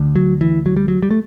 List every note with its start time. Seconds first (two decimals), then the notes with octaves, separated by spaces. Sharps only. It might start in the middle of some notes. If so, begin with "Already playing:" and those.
Already playing: D2 D3
0.16 F#3
0.41 E3
0.66 F#3
0.76 G3
0.88 F#3
1.02 G3
1.11 A3